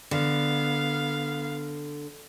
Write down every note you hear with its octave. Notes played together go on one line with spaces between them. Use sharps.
D3 B3 F5